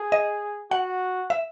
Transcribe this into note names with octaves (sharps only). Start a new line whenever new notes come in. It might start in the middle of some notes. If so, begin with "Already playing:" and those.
Already playing: G#4
D#5
F#4 F#5
E5